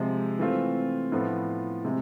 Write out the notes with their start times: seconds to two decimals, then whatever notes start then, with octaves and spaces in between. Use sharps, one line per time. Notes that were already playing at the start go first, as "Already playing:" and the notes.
Already playing: C3 F3 G#3
0.39 E3 A3 C4 F4
1.12 A2 F3 B3 F4
1.84 C3 G#3